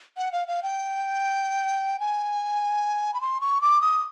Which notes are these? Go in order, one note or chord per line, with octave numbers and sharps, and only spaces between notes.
F#5
F5
F5
G5
G#5
B5
C6
C#6
D6
D#6